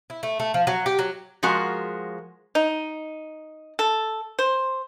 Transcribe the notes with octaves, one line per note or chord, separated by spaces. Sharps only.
E4
A3
A3
F3
F#3
G4
F#3
F3 G#3 F#4 A#4
D#4
A4
C5